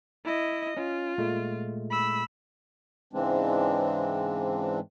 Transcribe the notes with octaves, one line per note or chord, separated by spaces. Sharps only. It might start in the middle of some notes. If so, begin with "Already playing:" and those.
E4 D#5
C#4 F4
A#2 G#3 A3
B5 E6
G#2 C#3 E3 G#3 C4 D4